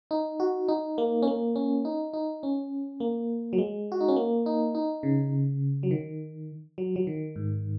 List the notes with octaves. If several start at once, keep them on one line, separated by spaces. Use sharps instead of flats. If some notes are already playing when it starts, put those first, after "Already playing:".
D#4
F#4
D#4
A#3
C#4
A#3
C#4
D#4
D#4
C#4
A#3
F#3
G#3
F#4
D#4
C#4
A#3
D#4
D#4
C#3
F#3
D#3
F#3
F#3
D#3
G#2